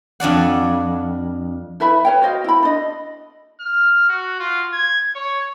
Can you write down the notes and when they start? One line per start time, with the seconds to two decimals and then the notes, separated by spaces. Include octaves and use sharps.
0.20 F2 D4 D5 F#5
1.80 E4 B4 E5 B5
2.05 B4 C#5 G5
2.22 F#4 C5 D#5 F5
2.44 E4 B5
2.63 D4 D#5
3.60 F6
4.09 F#4
4.40 F4
4.73 G#6
5.16 C#5